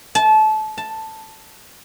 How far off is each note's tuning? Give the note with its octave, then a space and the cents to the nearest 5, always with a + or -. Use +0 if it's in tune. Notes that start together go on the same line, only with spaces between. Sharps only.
A5 -25
A5 +5